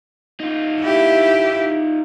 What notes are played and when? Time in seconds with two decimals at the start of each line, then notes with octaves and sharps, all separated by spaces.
0.40 D#4 F4
0.80 E4 G4